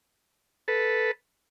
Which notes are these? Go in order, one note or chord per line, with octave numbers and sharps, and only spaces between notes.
A4 B4